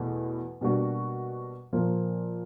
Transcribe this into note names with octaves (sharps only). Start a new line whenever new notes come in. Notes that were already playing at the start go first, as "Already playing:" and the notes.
Already playing: E2 B2 A3
B2 G3 A#3 D4 F#4
A#2 F3 A#3